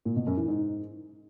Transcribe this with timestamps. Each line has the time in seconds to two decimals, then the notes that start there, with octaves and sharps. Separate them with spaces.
0.05 A#2
0.16 B2
0.27 F#2
0.37 E3
0.48 G#2